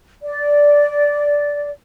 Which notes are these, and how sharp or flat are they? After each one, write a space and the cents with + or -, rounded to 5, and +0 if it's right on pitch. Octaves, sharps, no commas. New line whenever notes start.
D5 -10